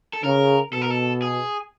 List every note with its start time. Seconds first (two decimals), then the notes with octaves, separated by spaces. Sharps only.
0.13 A4
0.23 C#3 A#4
0.73 B2 A4
0.81 A#4
0.90 A4
1.22 G#4